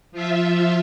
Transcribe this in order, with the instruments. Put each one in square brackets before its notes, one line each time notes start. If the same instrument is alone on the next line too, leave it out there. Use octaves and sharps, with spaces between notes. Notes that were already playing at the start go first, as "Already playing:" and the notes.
[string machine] F3 F4 E5